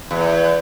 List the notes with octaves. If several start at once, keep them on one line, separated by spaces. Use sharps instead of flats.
E2